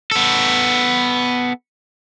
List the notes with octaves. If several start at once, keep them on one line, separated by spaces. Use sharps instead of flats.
B3 A4